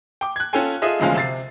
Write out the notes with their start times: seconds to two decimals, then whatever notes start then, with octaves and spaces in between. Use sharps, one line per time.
0.21 G5 D6
0.36 F#6 G#6
0.53 C#4 F4 A4 C#5 G5 G#5
0.82 F4 G#4 A4 D#5 E5
1.00 E1 D2 F3 G#3 C#4 F5
1.16 C3 A6 C7